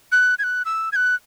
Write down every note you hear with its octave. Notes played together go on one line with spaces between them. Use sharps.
F#6
G#6
F#6
E6
G#6
F#6